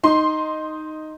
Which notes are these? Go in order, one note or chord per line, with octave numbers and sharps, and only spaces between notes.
D#4 C6